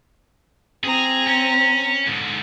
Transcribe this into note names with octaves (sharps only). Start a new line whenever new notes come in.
C4 G#4 A#5
C#4
G#2 D3